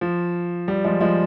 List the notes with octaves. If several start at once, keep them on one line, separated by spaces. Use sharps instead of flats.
F3
G3
F3 G#3
F3 G#3